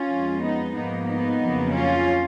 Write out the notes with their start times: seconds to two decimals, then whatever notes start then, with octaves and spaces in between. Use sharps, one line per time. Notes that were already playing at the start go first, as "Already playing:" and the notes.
Already playing: C#4 F4
0.09 F2 F3 G#3
0.41 B3 D#4
0.74 G#2 F3 A#3 B3 D#4
1.07 B3 D#4
1.40 F2 C#3 F#3 A#3
1.73 C#4 F4